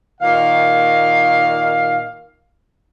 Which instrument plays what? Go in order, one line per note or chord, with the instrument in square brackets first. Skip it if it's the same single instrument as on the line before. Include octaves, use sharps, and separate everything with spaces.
[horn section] A#2 D#3 F5